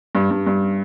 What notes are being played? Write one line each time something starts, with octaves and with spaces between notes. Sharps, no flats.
G2
G2
G2